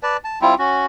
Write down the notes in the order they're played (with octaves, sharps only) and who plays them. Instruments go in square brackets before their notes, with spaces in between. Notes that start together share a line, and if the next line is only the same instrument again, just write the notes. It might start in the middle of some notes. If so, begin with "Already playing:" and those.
[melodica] B4 D5 A5
A5
G3 C4 E4 F4
C#4 F#4